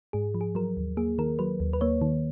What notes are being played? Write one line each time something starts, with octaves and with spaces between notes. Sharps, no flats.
G#2 G#4
F3
G#4
F#3 A#4
D#2
A#3 G#4
D#3 A#4
F#3 B4
D#2
B4
A#3 C#5
D#3